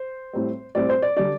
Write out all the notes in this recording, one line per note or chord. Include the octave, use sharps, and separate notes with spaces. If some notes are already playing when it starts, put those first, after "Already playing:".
Already playing: C5
A2 G3 C4
A2 G3 C4 D5
C5
D5
D3 G3 D4 D5